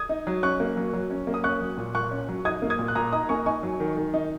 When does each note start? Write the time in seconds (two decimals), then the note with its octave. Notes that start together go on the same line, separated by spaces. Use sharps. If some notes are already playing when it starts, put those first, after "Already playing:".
Already playing: D#6 G#6
0.09 D#4
0.27 F#3
0.43 C#4 C#6 F#6
0.60 A#3
0.77 F#3
0.93 F#3
1.10 C#4
1.27 A#3
1.34 D#6
1.44 C#4 C#6 F#6
1.61 F#3
1.77 A#2
1.95 A#2 C#6 F#6
2.11 C#4
2.29 F#3
2.45 D#4 D#6 G#6
2.62 A#3
2.70 D#6 G#6
2.79 A#2
2.88 F#6
2.95 A#2 A#5 D#6
3.12 D#4 A#5 D#6
3.29 A#3 G#5 C#6
3.46 D#4 G#5 C#6
3.63 F#3
3.80 D#3
3.96 D#3
4.14 D#4